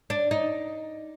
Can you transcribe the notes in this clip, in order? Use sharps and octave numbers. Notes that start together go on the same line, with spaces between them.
D4
D#4